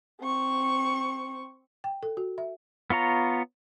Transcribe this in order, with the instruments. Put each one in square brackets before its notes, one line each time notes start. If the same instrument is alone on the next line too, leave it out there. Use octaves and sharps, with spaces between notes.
[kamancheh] C4 C#6
[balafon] G5
A4
F#4
E5
[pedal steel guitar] B3 F4 C#5 A#5